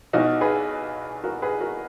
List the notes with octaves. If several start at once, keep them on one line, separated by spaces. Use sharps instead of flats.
B1 B2 D#4 F#4
G#4 B4
F#4 A#4
G#4 B4
F#4 A#4